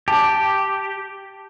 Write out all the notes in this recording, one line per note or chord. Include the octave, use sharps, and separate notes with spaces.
G4 A5